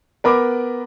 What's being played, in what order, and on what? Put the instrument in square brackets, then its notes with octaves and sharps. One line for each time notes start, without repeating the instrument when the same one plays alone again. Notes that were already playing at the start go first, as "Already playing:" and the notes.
[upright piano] B3 A#4 B5 D6